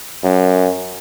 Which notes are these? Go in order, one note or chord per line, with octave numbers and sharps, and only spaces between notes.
F#2